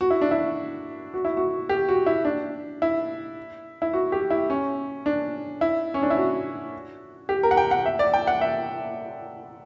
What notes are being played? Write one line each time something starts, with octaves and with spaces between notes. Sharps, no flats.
F#4
E4
D4
E4
F#4
E4
F#4
G4
F#4
E4
D4
E4
E4
F#4
G4
E4
C#4
D4
E4
C#4
D4
E4
F#4
G4
A#4
F#5
G5
F#5
E5
D5
G5
F#5
E5